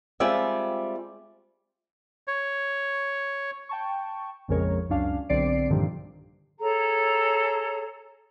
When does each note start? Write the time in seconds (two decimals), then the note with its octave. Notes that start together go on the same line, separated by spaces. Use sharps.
0.20 G3 G#3 C4 F4 D5 E5
2.28 C#5
3.69 G5 A5 C#6
4.48 A#1 F2 C#3 G#3 A#4 C#5
4.89 C#2 F#2 C#4 D4 F5
5.29 B1 D3 C4 D5 C7 D7
5.69 G2 A#2 D3 D#3 F3 G3
6.60 G#4 A4 C#5 A#5